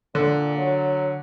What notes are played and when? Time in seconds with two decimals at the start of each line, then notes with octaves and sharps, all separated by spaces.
0.15 A#2 D3
0.57 F#3